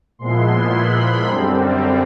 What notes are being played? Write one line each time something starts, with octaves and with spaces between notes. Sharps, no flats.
A#2 F3 G#3 B3 E4 C6
B5
F#2 D3 G3 C4